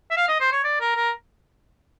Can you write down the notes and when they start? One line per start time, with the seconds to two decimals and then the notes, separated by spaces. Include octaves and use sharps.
0.11 E5
0.17 F5
0.28 D#5
0.40 C5
0.52 C#5
0.64 D5
0.80 A#4
0.96 A#4